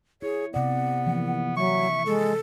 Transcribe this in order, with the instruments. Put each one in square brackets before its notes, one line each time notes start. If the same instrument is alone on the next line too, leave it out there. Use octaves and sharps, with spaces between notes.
[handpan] E4 [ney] G#4 [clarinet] C#5
[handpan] C3 D5 [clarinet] B3 [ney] F#5
[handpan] E3 F3 A#3
[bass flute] F#3 [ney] E5 [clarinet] C#6
[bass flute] G#3 [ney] A4